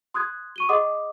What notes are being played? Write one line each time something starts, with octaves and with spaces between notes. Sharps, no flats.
C6 D#6 F#6 G#6
C#6 D#7 G7
G#4 D#5 F#5 C6 D6 D#6